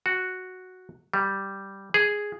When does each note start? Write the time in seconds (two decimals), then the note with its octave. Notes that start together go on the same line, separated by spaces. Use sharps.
0.06 F#4
1.14 G3
1.94 G#4